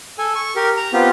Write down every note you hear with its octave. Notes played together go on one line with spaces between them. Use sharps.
A4 G#5
C#6
G4 A#4
A#5
B3 C4 F4 G4